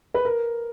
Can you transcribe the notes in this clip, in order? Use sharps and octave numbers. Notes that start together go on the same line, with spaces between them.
B4
A#4